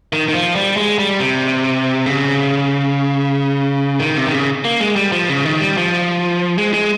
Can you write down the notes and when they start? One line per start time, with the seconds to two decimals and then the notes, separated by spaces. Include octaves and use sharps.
0.13 D#3
0.28 D#3
0.34 F3
0.55 G3
0.77 G#3
0.99 G3
1.20 C3
2.06 C#3
4.00 D#3
4.16 C3
4.27 D#3
4.32 C#3
4.65 A#3
4.80 G#3
4.96 G3
5.12 F3
5.29 C#3
5.46 D#3
5.61 G3
5.77 F3
6.58 G#3
6.74 G#3